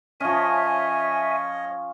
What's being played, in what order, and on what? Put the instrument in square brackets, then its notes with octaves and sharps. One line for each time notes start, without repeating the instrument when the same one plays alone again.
[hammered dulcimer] F3 C#4 [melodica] C#5 D#5 [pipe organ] E5 G#5